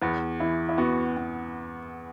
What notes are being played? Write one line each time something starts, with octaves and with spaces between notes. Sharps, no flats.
E2 B3
E3 E4
E4
B3 F#4
B3